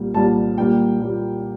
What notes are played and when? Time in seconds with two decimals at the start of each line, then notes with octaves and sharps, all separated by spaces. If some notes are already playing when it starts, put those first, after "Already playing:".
Already playing: C2 A#2 G3 A#3
0.14 C2 A#2 G3 A#3 A5
0.58 A#2 G3 A#3 G5
1.00 A#2 G3 A#3